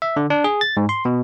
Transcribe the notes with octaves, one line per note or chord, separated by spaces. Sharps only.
E5
D3
D4
G#4
A6
G#2
C6
B2